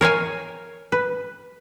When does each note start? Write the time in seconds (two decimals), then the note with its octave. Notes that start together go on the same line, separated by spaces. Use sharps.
0.01 A#4 C#5 F5 G#5
0.92 B4